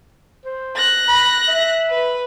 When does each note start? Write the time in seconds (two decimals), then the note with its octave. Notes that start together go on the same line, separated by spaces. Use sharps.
0.45 C5
0.76 F#6 A#6
1.08 B5
1.48 E5
1.90 B4